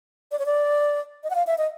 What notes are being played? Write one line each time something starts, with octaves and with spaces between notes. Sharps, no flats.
D5
C#5
D5
D#5
F#5
F5
E5
D#5